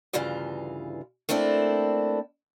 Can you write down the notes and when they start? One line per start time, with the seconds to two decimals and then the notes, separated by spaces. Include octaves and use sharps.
0.13 D2 G2 C#3 E3 F4
1.29 A3 A#3 C4 D4 E4